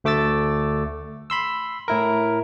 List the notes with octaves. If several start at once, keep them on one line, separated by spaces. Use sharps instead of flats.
D2 A3 D6 E6 A6
B5 C6 E6
A2 E4 A#4